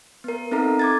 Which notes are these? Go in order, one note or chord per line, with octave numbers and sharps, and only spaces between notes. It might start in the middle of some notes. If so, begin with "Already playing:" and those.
B3 A#4
C4 D#4 A4 E5 A#5
D6 G#6 A6